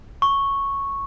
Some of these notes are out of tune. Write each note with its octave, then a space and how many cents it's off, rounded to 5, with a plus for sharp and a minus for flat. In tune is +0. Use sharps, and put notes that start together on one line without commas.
C#6 -5